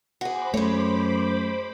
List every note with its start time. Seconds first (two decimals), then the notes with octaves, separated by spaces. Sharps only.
0.21 F#4 G#4 C5 B5 D6
0.54 F#2 G#3 A3 C#5